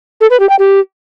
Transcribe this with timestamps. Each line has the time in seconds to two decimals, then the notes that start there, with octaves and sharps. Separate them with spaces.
0.21 A4
0.30 B4
0.40 G4
0.49 G5
0.59 G4